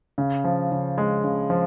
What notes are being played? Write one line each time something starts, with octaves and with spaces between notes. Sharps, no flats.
C#3
F3
C#3
G#3
C#3
F3